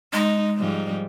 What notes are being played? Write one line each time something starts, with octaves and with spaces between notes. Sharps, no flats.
G#3 D#4
G#2 F3 G3